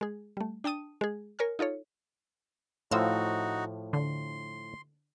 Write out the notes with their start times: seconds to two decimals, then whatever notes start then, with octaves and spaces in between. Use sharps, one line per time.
0.01 G#3 G#4
0.37 G3 A3
0.64 D4 G5 A5 D#6 D#7
1.01 G#3 G#4
1.39 A#4 C#5 G#5 F6
1.59 D#4 F4 A4 C#5
2.91 A2 F3 D#4 F#4 C5 F5 E6
3.93 D3 C6